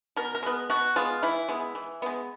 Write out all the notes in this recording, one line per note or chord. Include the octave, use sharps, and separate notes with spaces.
B2 A#4
A#4
G#3 B3
B2 F#4
G#3 B3 F4
E3 E4
G#3 B3
E3
G#3 B3